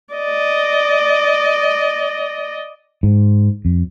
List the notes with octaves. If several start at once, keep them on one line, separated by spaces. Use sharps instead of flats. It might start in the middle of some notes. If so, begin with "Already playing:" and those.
D5 D#5
G#2
F2